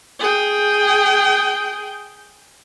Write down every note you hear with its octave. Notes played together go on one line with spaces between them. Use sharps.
G#4 G5